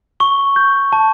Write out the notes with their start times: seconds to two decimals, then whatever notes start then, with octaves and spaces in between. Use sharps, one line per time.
0.20 C#6 G7
0.56 G6
0.92 A5